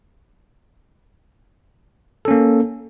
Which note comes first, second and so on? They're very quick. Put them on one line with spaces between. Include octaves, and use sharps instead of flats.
A4 C#4 A#3